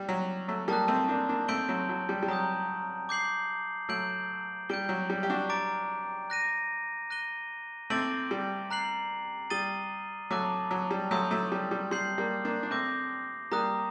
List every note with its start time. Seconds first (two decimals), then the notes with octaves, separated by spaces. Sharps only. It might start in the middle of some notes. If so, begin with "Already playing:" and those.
Already playing: G3
0.09 F#3
0.48 F#3 A3
0.68 G3 A#3 A5 D#6 F#6
0.88 A3 C4
1.08 A#3 D4
1.29 A#3 D4
1.48 A3 C4 C6 G6 D7 G7
1.69 F#3 A3
1.89 F#3
2.09 G3
2.23 G3
2.28 F#3 A#5 D#6 G6
3.09 D6 G6 C7 F#7
3.89 F#3 A3 G6 D7 F#7
4.69 G3 G6 D7 G7
4.89 F#3
5.10 G3
5.23 G4
5.30 D4 F#4
5.49 A#5 D6 A6 D7
6.30 F#6 A#6 D#7
7.10 F#6 A#6 D#7 G7
7.90 A3 C4 D6 A6 D7 F#7
8.31 G3
8.71 A#5 F#6 C7 F#7
9.50 G3 D#6 A6 D#7 G7
10.31 F#3 A3 A5 D6 F#6
10.71 F#3
10.91 G3
11.11 F#3 A3 C6 D#6 G6
11.31 F#3 A3
11.52 G3
11.71 G3
11.91 G3 C6 G6 C7 F#7
12.18 G3 A#3
12.45 A#3 D4
12.63 D4
12.71 A3 C4 D6 G6 A#6
13.51 G3 A#3 A#5 D#6 F#6